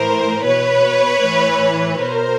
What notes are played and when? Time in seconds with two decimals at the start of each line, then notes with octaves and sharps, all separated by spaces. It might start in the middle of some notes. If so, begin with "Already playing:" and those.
Already playing: A2 E3 A#4 C5
0.46 B2 B4 C#5
1.23 A2 E3
2.00 B2 A#4 C5